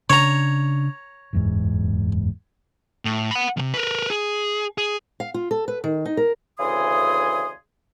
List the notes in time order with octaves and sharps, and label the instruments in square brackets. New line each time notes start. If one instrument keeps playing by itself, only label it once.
[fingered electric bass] C#3 D4 [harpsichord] C#5 A#5
[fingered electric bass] F#1 E2 G#2
[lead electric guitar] A2
F#5 B5
E2 C3
A#4 B4
G#4
G#4
[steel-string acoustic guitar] F5
F4
A4
B4
D#3
D#4
A#4
[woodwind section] D2 C#3 E3 G#4 C6 D#6